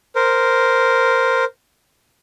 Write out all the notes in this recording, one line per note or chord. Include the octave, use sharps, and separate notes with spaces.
A#4 C5